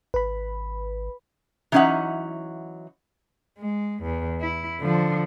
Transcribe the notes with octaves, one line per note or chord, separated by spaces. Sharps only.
G#1 B4 B5
E3 F#3 C#4 D#4 E5 F#5
G#3
E2
E4
D3 F3